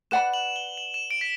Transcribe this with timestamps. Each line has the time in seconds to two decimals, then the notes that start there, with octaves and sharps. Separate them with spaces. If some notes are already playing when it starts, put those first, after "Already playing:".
0.11 B4 D5 F#5 B5 E7
0.34 F#7
0.56 G7
0.78 F#7
0.94 E7
1.11 D7
1.21 B6